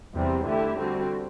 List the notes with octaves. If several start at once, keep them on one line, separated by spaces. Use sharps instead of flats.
E2 C3 G3 C4
D3 A3 E4 G4
D3 G3 C4 F#4